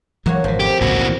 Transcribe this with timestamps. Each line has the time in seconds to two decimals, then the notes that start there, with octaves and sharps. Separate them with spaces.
0.26 E3 F#3 G#3 A#3 F#4 C#5
0.44 G#1 B2 F3
0.60 F2 G4
0.80 G#1 C#2 A#2 F#4
1.00 D2 E3